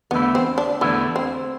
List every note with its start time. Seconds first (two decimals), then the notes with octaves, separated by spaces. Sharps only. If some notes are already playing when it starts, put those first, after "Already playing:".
0.11 E2 D3 A3 B3 E4
0.35 C4
0.58 D4
0.81 E2 D3 A3 B3 E4
1.16 C4